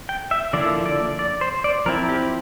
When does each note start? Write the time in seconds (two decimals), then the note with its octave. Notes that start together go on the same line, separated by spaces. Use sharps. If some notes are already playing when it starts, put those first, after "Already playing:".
0.09 G5
0.31 E5
0.53 D3 F3 A#3 E4 D5
0.86 D5
1.19 D5
1.41 C5
1.64 D5
1.86 F3 C4 E4 A#4
2.09 G4